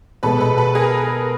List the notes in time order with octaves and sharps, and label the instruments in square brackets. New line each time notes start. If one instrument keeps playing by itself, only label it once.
[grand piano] B2 G#3 B3 [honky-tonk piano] A4 B4
[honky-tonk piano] A4 B4
A4 B4
G#4 A#4